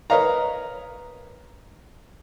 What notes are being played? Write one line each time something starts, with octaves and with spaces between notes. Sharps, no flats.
A#4 B4 C#5 D#5 F5 A#5